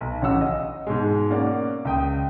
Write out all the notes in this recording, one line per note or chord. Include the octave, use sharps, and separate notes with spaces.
B1
A1 C#3 F#3 F#5 E6
D#5
G#2 B2 G#3
A#3 C#4 D5 F#5
C#2 G5 D#6